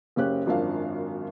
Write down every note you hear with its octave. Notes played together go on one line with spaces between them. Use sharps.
F#1 C#3 C#4 G4 F#6
G#1 F#2 F3 D4 A#4 F5